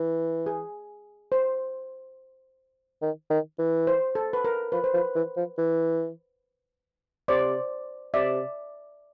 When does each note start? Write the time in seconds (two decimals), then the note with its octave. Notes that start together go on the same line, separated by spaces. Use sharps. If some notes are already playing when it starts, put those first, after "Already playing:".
Already playing: E3
0.46 G#4
1.32 C5
3.02 D#3
3.30 D#3
3.59 E3
3.87 C5
4.15 A4
4.33 B4
4.45 A#4
4.72 F3 B4
4.84 C5
4.94 F3 B4
5.15 E3
5.37 F3
5.58 E3
7.28 C3 C5 D5
8.14 C3 D5 E5